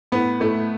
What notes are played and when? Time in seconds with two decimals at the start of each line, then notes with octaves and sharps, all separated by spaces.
0.12 A2 B3
0.40 A2 A3